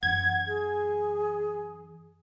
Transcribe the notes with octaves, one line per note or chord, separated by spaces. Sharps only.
F#2 E3 F#5 G#6
G#4